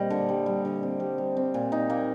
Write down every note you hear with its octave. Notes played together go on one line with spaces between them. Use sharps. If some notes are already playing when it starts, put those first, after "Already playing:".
Already playing: A#2 G3 C4 C5 D#5
D3
G3
G3
D3
C4
G3
G3
C4
A#2
D#4
A#3